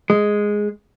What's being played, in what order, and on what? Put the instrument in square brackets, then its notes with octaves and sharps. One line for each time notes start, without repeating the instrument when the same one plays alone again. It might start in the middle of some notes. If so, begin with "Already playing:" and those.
[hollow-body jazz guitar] G#3